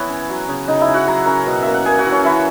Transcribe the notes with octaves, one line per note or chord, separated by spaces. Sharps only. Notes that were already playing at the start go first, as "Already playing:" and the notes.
Already playing: E3 B3 B4 C#5
C#4
F#3
C#3
C#3 D#4 D#5
E4 E5
C#4
F#4 F#5
F#3 A#5
C#4 A#4 A#5
B2
A#3 E5
F#5
A#3 G#4 G#5
F#4 F#5
E3
C#4 C#5
E3 E4 E5